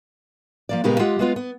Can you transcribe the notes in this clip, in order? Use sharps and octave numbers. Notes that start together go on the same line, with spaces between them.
F3 A#3 D5
A#2 C#3 G#3 B3 G4 A#4
G#3 F4 G4 F#5
G#3 B3 F4
B3